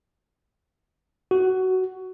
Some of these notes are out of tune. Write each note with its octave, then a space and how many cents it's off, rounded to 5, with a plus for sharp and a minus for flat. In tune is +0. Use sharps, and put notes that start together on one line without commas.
F#4 +15